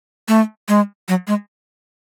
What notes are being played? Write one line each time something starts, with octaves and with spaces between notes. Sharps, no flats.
A3
G#3
F#3
G#3